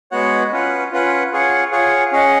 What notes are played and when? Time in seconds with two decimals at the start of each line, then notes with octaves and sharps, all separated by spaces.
0.11 G#3 B3 F#4 C#5 F#5
0.52 C#4 F4 B4 F#5
0.92 C#4 F4 B4 F#5
1.32 F4 G#4 C#5 F#5
1.72 F4 G#4 C#5 F#5
2.12 C#4 G#4 D#5 F#5